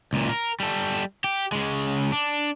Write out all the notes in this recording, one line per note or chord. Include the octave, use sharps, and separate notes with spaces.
C#2 A#2
A#4
G3 A4
G4
C#3 G#3
D4